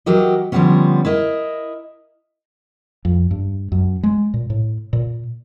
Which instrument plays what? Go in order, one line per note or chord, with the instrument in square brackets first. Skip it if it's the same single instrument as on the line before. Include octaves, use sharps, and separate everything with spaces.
[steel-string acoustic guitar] E3 F#3 F#4 G4 A#4 D#5
D3 F3 G3 G#3 B3 C#4
E4 A#4 D#5
[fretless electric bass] F2
G2
F#2
G#3
A#2
A2
A#2